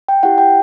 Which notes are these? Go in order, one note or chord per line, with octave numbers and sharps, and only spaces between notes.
G5
E4 G4 F#5
G5